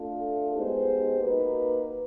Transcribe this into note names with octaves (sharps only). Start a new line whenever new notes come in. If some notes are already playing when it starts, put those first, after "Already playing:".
Already playing: A3 D4 F4 A4
G#3 B3 D#4 G4 C5
A#3 D#4 F#4 B4